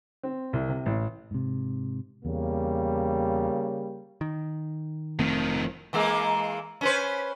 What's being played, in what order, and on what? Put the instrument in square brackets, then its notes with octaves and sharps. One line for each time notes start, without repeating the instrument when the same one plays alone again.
[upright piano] C4
C2
C3
A1
[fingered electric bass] G#2 C3
[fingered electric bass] E2 [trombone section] C#3 G3 A#3
[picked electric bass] D#3
[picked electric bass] F1 A3 C4 [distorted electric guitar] D#3 F3
[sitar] E3 G#3 A#3
C#4 B4 C5